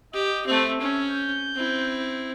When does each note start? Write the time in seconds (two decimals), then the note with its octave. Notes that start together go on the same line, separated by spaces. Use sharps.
0.13 G4 D#5
0.46 A3 C4 E5
0.80 C#4
1.10 G6
1.55 C4 E4